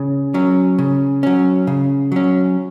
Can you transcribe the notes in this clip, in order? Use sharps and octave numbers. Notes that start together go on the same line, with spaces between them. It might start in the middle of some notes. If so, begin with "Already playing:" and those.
Already playing: C#3
F#3 C#4
C#3
F#3 C#4
C#3
F#3 C#4